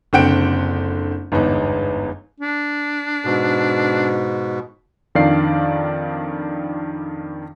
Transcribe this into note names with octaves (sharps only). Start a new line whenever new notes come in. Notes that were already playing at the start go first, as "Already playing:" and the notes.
F#1 D3 C4 F#5 G5 D7
G1 E2 G#2 D#4
D4
G#2 B2
F2 D#3 D4 D5 F5 C7